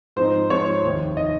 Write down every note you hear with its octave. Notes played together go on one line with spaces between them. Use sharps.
G#2 F3 C4 D#4 C5
G#2 F3 C4 D#4 C#5
F1 D#2 D#3
D#3 D#5